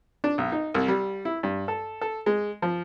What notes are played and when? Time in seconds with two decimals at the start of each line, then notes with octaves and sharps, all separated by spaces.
0.24 D4
0.38 B1
0.52 D#4
0.74 C2
0.88 G3
1.25 E4
1.43 G2
1.68 A4
2.01 A4
2.26 G#3
2.62 F3